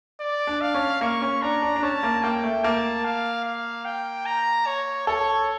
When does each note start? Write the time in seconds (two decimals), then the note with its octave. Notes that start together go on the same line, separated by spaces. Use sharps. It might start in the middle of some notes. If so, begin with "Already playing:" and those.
0.20 D5
0.47 D4
0.61 F5
0.74 C#4
1.01 A#3 C#6
1.22 C#4
1.42 D4 A#5
1.62 D4
1.76 D4
1.83 C#4 A5
2.03 A#3
2.23 A#3 G5
2.44 A3
2.64 A#3 A5
3.04 F5
3.45 F5
3.85 G5
4.26 A#5
4.66 C#5
5.07 A4 C#5